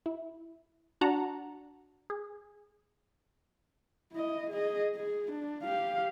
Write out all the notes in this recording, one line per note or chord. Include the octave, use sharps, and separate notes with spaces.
E4
D4 F#4 F#5 A5 A#5
G#4
E4 D#5
G#4 D#5
G#4
D4
G4 F5